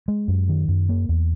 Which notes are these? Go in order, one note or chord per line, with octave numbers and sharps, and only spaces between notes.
G#3
F#2
D#3
F#2
A#3
E2